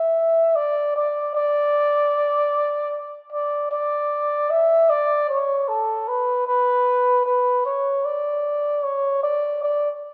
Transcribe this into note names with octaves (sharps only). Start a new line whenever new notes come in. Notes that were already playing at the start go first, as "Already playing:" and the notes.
Already playing: E5
D5
D5
D5
D5
D5
E5
D5
C#5
A4
B4
B4
B4
C#5
D5
C#5
D5
D5